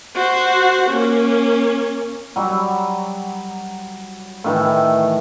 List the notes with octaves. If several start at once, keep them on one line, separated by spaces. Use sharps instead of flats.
F#4 C5
A#3 C#4
F#3 G3
A2 D#3 E3